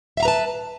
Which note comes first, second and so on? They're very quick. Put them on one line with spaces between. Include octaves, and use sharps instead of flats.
E5 F5 A#5 B4 A5